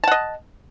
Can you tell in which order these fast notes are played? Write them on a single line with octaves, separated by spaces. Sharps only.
A5 F#5 D#5